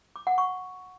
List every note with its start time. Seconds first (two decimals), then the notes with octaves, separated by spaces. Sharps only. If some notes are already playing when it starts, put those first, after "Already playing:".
0.16 D6
0.27 F#5
0.38 C#6